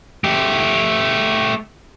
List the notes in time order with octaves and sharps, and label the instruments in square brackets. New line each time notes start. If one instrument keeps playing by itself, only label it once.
[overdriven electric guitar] A3 G4